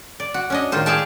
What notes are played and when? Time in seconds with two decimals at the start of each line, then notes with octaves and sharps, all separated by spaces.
0.20 D5
0.34 F#4
0.50 C#4 D4 D#5
0.72 A2 D#3 F4 C5
0.86 G#4 D5 E5 F5 G5 A5